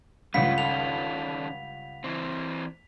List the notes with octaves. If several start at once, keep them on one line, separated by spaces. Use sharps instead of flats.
C#2 G2 A3 C#4 F4 F5 F#5 B6
D#3 C#4 A4 F7
E3 C4